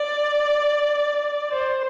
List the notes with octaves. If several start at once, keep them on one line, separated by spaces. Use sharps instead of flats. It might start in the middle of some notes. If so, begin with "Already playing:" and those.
Already playing: D5
C5